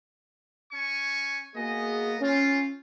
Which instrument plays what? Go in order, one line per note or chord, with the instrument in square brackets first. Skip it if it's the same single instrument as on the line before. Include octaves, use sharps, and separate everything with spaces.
[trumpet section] C#4 G#5 C#6
[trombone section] A#3 F#4 G#4 [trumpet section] B3 D#5
[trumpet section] C4 F4 [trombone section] C#4